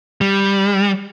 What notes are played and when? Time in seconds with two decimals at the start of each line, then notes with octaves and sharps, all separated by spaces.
0.21 G3